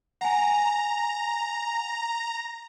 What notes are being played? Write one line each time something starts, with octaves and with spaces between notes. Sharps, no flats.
F#5 G#5 A#5